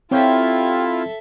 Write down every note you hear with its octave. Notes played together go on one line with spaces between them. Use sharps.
C4 E4 F4 G4 A4 C#5 E5 G5